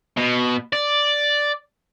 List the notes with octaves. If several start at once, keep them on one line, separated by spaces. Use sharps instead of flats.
B2
D5